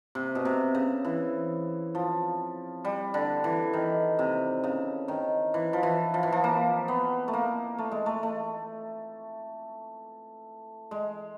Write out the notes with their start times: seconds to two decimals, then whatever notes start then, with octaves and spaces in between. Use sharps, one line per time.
0.15 C3
0.35 B2
0.45 C3
0.75 C#3
1.05 E3
1.95 F3
2.85 G3
3.14 D3
3.44 E3
3.73 D#3
4.19 C3
4.64 C#3
5.08 D#3
5.54 E3
5.73 F3
5.83 E3
6.14 F3
6.23 E3
6.32 F3
6.44 A#3
6.88 B3
7.28 A3
7.33 A#3
7.78 A3
7.92 G#3
8.06 A3
8.23 A3
10.91 G#3